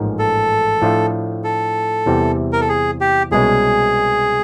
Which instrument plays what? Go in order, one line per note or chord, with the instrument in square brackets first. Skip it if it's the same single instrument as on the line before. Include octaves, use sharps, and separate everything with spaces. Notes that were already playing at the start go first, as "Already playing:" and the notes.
Already playing: [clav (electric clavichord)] A1 G#2 F3 A#3 D#4
[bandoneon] A4
[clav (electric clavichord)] A2 F3 A3 D4 F4
[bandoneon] A4
[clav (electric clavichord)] E2 C3 E3 G3 C4
[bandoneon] A#4
A4
G#4
G4
[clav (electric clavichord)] C2 B2 G#3 C#4 [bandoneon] G#4